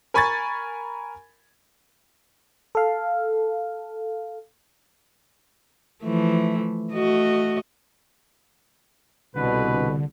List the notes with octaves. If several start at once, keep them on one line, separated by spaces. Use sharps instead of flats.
A#4 G#5 B5 C#6 G#6 A6
A4 F5
E3 F3 A3
A3 F#4 D#5
C2 B2 D3 B4